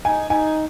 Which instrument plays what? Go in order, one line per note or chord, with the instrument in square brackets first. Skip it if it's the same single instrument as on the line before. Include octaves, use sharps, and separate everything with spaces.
[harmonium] D#4 [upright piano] G#5
[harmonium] D#4 [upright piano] G#5